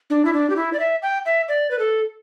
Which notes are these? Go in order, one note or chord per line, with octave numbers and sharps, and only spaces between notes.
D4
E4
D4
G4
E4
D5
E5
G5
E5
D5
B4
A4